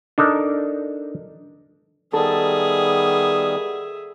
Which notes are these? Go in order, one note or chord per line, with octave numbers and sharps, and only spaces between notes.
D4 D#4 A4 A#4
D#3 G3 B3 G#4 A4 E5